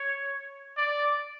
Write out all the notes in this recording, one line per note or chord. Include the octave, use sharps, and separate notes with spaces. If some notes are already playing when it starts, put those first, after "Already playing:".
Already playing: C#5
D5